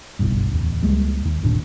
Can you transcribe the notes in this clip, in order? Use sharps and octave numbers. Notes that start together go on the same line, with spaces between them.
F#1 B1 G2
D1 E2
C#2 G3 G#3 A#3
D#2
G1 D#2 A#2 D4